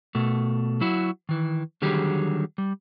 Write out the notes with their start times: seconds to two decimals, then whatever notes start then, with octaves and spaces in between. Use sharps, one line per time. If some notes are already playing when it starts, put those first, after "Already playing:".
0.15 B2 A3
0.81 F#3 E4 F#4
1.29 D#3 E3
1.82 D3 D#3 F#3 G3 G4 G#4
2.58 G3